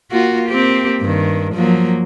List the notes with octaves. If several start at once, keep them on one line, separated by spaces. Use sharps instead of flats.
A#3 F4 F#4
A#3 C4 G4
G2 D#3
F3 F#3 A#3